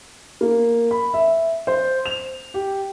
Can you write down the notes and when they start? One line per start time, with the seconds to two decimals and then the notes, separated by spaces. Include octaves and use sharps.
0.41 A#3
0.91 B5
1.14 E5
1.67 C5
2.06 F7
2.54 G4